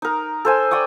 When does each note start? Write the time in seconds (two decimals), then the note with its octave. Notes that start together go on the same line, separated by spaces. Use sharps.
0.02 D#4 A#4
0.45 A4 C5 G#5
0.71 D5 G5 C#6 D#6